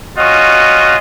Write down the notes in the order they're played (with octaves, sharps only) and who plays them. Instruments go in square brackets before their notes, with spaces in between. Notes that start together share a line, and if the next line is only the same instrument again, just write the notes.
[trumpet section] C#4 F4 F#4 D#5